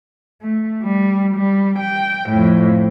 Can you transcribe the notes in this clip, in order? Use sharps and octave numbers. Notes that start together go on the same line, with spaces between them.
A3
G3
G3
G5
F2 A2